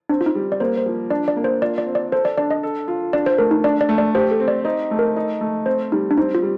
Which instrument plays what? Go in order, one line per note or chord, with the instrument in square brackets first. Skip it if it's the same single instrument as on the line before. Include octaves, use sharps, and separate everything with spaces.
[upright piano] C4 [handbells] D4
[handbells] F4
D#4
[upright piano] G3
[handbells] D5
[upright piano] A#3 [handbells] C5
[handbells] C5
[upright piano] F3
[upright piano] D4 [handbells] D5
[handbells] D5
[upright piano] A#3
[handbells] C5
[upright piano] F4 [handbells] D5
[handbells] D5
[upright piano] C4
[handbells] D5
[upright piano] A4 [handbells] C5
[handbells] D5
[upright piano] D4 [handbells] D5
[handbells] D#5
[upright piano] A4
F4
[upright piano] D4 [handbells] D5
[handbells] C5
[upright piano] A3 [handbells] A#4
[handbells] D#4
[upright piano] D4 [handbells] D5
[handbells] D5
[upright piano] A3
[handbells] D5
[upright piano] G4 [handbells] C5
[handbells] A4
[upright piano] C4
[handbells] D5
[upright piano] D#4 [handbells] C5
[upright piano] A3
[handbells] A#4
[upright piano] D#4
A3
[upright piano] C4 [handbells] C5
[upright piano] G3 [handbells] D#4
[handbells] D4
[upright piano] C4 [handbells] D#4
[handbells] F4
[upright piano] G3